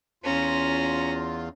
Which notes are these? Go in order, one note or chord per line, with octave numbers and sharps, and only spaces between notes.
E2 C#4 F4 A#5